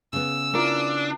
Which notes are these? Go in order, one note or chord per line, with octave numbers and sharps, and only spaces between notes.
C#3 B3 E6
D4 E4 F4 A#4